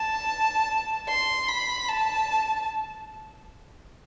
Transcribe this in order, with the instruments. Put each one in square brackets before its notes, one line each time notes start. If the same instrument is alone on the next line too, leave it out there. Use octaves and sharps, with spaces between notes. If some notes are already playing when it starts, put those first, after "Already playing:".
Already playing: [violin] A5
C6
B5
A5